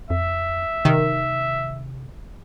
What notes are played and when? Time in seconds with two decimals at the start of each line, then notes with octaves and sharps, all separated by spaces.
0.10 F2 E5
0.85 C3 D#3